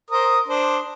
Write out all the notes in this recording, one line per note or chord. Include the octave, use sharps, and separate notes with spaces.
A#4 C5 D#6
D4 C5